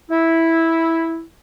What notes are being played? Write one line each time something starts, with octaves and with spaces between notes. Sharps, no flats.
E4